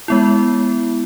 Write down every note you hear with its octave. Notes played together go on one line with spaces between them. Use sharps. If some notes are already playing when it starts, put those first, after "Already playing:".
G#3 B3 E4